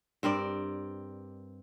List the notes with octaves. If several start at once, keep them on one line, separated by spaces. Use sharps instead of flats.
G2 C4 A#4 D5